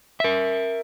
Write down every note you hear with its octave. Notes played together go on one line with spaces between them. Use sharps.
A#4 E5